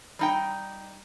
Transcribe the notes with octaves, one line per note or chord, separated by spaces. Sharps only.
G3 D#4 G5